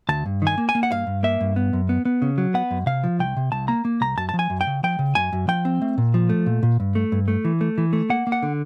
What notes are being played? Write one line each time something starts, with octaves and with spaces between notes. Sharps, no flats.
D2 A5
G2
D#3 G#5
A#3
G#5
A#3
F#5
G2 F5
G2
A#3 E5
G2
B3
F#2
B3
B3
C#3
F#3
B3 F#5
F#2
C3 F5
F3
C2 G5
C3
C2 A5
A#3 A#5
A#3
C2 A#5
F#2 A5
A5
F3
G#5
F#2
G5
C#3
F3 G5
C#3
F#2 G#5
F#2
F3 G5
C4
A3
A#2
F3
A3
A#2
A#2
G2
A3
G2
A3
E3
A3
E3
A3
A#3 F#5
A#3
F#5
D3